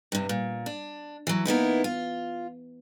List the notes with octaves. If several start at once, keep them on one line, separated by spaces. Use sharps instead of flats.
G2 C3
A#2
D4
E3 F#3
A#3 B3 D#4 E4
F4